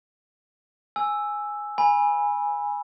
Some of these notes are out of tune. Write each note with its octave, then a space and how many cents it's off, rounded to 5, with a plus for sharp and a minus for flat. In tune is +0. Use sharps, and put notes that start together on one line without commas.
G#5 +0 E6 +0
G#5 -10 B5 -20